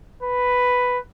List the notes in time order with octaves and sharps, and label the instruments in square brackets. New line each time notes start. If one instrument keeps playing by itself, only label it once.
[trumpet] B4